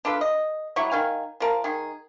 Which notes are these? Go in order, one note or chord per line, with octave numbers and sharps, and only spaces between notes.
D4 F4 A4 B4
D#5
F#3 G3 E4 C#6
D#3 F5 G#5
F3 A#4 A5
D#3 G#4